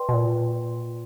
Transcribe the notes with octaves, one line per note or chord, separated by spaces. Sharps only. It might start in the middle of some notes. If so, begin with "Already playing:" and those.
Already playing: B4 D5 G5 C6
B2
A#2